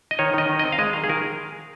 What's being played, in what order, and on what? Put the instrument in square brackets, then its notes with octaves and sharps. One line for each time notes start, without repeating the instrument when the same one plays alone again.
[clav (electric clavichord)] D#5
D#3 C#5
D#3 D#5
D#3
C4 D#5
F5
G#3 D#5
D#3 F5
G#4
D#3 A#4